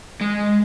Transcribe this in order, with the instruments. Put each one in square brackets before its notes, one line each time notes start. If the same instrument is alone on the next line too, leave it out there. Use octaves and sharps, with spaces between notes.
[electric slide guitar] G#3